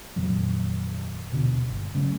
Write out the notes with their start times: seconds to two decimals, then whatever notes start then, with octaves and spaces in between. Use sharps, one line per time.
0.16 F2 A#2 D#3 F#3
1.32 D#1 B2 D3 D4
1.70 G1
1.95 C#3 F#3 A3 C#4